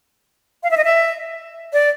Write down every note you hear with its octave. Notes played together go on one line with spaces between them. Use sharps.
F5
E5
D#5
E5
D5